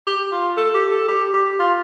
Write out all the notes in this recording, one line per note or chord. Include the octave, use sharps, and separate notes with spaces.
G4
F4
A4
G4
A4
G4
G4
F4